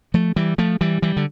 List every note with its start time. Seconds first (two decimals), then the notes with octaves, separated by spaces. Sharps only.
0.14 F3 A3
0.36 E3 G3
0.58 F3 A3
0.81 E3 G3
1.02 E3 G3
1.17 D3